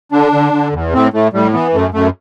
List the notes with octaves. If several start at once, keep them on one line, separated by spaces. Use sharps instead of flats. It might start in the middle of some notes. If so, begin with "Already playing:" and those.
D3 D4
D3
D3
E2
A2 C4
A2 A3
A2 G3
E3 B3
F#2 A3
F#2 A3